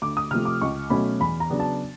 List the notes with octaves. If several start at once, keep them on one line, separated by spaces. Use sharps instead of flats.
D2 D6
D#6
C3 F3 A3 F6
D6
C#2 C#6
B2 F#3 A3 C#4 B5
E2 B5
A#5
C#3 F#3 B3 D4
A5